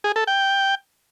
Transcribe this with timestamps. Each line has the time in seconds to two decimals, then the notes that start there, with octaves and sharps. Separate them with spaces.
0.04 G#4
0.16 A4
0.27 G5